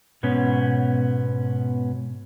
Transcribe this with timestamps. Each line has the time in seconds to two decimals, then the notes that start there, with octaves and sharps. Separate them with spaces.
0.23 G#2 B2 B3 C#4